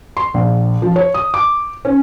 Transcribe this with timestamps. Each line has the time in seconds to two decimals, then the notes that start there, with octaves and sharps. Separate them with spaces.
0.17 C6
0.34 A#1
0.82 F3
0.96 C#5
1.14 D#6
1.34 D6
1.85 C#4